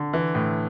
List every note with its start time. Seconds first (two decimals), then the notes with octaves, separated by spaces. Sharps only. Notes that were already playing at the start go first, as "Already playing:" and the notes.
Already playing: D3
0.13 E3
0.35 A2